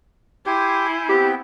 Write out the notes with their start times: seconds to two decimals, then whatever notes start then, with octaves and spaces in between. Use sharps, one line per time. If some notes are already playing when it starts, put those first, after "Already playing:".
0.46 E4 G4 G#5 C6 G6
1.09 B3 C4 G4 G5